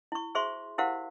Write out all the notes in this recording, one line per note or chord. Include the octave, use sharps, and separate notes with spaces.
E4 C#6
F#4 G#4 C5 E5 C6 C#6
E4 G4 A#4 C5 F5 F#5